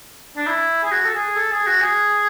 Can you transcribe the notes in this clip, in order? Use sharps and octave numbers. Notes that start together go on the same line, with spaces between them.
D4
E4
G#4
F#4
A4
G#4
A4
G#4
F#4
G#4